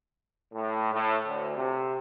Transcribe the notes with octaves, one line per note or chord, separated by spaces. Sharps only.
A2
A2
D2
C3